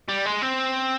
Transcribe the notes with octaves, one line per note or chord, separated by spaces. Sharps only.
G3
G#3
C4